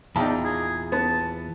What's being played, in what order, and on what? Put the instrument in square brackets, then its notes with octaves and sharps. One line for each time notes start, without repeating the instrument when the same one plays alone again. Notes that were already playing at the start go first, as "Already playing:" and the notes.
[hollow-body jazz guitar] E2 A#2 [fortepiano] D#4 G5 A5
[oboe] G#4
[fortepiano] B3 [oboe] A5